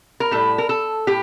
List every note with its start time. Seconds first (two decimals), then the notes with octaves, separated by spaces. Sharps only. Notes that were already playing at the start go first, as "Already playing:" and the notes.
0.20 A#4
0.31 A2 G3 A4
0.58 A#4
0.69 A4
1.07 A2 G4